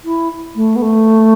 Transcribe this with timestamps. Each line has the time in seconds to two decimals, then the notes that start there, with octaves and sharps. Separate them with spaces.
0.04 E4
0.55 A3
0.75 B3
0.82 A3